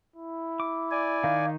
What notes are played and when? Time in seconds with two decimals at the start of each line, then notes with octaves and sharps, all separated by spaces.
0.16 E4
0.60 D6
0.91 D5 G#5
1.24 D#3 D#4 F5